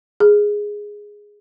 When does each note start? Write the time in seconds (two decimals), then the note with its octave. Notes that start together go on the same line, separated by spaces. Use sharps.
0.20 G#4